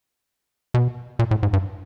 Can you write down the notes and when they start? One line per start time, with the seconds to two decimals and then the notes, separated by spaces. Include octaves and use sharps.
0.74 B2
1.19 A#2
1.31 A2
1.43 G#2
1.53 G2